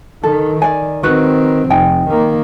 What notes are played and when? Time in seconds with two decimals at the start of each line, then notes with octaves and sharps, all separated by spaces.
0.23 D#3 A4
0.62 D5 G#5
1.03 D#3 C4 F#4 B4
1.70 F1 D#4 G5 G#5
2.09 D#3 A#3